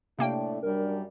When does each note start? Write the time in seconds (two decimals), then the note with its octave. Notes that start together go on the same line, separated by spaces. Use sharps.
0.19 A2 C3 A3 A#3 D4 G5
0.63 F#2 G3 D4 A#4